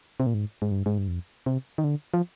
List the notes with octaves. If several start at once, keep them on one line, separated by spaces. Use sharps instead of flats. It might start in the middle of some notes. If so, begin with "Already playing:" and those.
C3
A#2
G#2
G#2
G2
G#2
G2
F2
C3
D#3
D3
F3